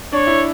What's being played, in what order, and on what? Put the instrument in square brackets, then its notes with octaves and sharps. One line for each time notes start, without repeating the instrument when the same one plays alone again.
[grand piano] D4 [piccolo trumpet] C#5
[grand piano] E4